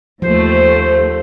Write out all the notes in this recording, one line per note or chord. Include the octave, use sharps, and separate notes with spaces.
D#2 F3 A3 C5